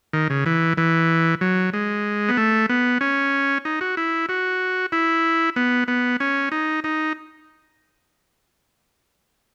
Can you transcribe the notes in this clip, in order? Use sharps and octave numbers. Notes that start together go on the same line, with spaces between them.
D#3
C#3
E3
E3
F#3
G#3
B3
A3
B3
C#4
D#4
F#4
E4
F#4
E4
B3
B3
C#4
D#4
D#4